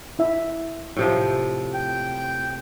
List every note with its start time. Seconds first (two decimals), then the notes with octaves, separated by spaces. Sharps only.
0.19 E4 E5
0.97 A2 C3 F3
1.74 G5